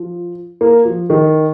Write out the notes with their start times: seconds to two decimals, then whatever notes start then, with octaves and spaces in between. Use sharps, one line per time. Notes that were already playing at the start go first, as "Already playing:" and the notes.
Already playing: F3
0.61 A#3
0.85 F3
1.10 D#3